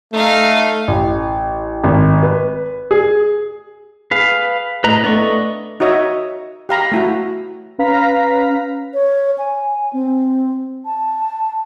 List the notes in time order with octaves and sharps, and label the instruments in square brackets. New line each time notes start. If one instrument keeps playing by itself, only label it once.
[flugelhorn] A3 [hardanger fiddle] D#4 F5
[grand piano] A1
G#1
B4
G#4
[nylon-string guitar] G#4 [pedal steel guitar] B4 F5
[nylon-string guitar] A2 [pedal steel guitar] B4 D#5 A#5
[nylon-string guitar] A3 B3 D4 [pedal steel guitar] D5 D#5 C#6
[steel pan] D#4 F#4 C#5 D#5 E5
G4 F5 A#5 B5
A3 E4 F#4
[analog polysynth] C#4 B4 F5 A#5 B6
[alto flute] C#5
G#5
C4
A5